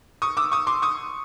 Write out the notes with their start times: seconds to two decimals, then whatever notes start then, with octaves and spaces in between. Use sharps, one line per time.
0.22 C#6 D#6
0.37 D6 E6
0.52 C#6 D#6
0.67 C6 D6
0.82 C#6 D#6